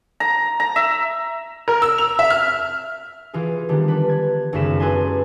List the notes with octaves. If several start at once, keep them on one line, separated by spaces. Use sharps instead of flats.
A#5
A#5
E5
A#4
E6
F7
E5
F6
E3 F4 G#4
D3 D#3 G3 G#3 B3
D4 B4
G#6
G#1 F#2 C#3 B3 B6 E7
E4 G#4 A4 B4 G#5 C6